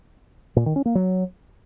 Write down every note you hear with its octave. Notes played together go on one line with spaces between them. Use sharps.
A#2
D#3
C#4
A#3
F#3